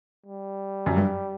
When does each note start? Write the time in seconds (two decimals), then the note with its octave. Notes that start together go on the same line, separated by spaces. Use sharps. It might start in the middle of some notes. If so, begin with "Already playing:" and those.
0.26 G3
0.86 F#2
0.96 G2